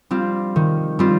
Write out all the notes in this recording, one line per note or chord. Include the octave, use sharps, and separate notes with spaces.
G3 C4 F4
D#3
G3 C4 F4